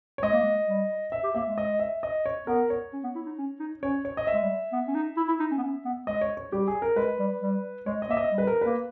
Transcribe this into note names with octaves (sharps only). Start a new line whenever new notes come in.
C#5
G#3 D#5
A#3
G#3
G3
E5
G4
A#3 E5
G#3
D#5
E5
D#5
C#5
B3 A#4
C#5
C#4
B3
E4
D#4
C#4
D#4
C#4 C#5
C#5
D#5
E5
G#3
G3
B3
C#4
D#4
E4
E4
D#4
C#4
B3
C#4
B3
G#3 D#5
C#5
C#5
G3 G4
G#4
A#4
G#3 B4
G3
G3
G#3 C#5
D#5
A#3 E5
D#5
G3
B4
A#4
A#3 B4